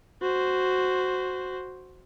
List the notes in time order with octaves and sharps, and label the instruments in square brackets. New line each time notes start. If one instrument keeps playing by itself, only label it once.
[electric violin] F#4 C5